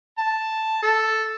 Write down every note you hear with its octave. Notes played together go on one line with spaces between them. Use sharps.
A5
A4